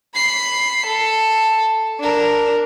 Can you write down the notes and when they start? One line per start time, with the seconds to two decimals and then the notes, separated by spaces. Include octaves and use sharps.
0.14 B5 C7
0.86 A4
2.00 D4 A#4